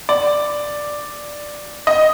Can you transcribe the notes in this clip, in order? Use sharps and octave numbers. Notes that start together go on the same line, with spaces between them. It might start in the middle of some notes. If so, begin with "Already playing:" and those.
D5
D#5